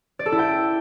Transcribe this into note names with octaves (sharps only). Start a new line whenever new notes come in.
D5
A4
E4
G5